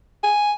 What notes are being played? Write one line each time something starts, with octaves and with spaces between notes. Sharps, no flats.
G#5